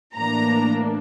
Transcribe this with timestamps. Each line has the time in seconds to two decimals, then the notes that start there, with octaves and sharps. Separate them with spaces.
0.15 A2 E3 A#3 D4 A#5